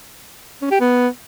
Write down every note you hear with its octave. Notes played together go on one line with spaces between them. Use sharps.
C#4
G4
B3